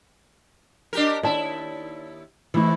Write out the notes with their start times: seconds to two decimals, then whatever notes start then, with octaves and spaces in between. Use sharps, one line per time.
0.93 D4 G4 A#4
1.23 D#2 E4 D5 A5
2.54 G#2 E3 A3 E4